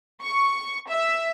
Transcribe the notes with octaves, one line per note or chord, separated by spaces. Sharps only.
C#6
E5